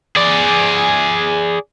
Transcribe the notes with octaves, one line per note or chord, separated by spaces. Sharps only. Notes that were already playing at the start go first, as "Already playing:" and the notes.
G#4 D5